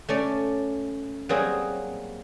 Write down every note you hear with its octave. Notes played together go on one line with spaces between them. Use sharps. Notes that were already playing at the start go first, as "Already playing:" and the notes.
A3 C#4 D5
F#3 G3 A#3 C4 G#4